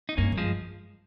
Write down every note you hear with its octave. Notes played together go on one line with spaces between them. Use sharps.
D#4
G2 A#3 C#4
G2
F3 G#3